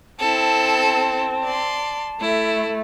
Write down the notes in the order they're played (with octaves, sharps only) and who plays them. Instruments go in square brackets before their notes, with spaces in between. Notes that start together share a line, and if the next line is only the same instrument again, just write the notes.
[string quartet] C4 [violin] E4 A4 [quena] A5
[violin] D5 C6
[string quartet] A3 [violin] E4